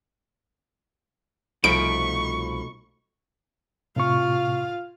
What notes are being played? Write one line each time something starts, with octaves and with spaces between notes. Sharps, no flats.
C2 B2 F3 A3 D#4 B5 C#6 D7
A2 C3 F4 F5 C#6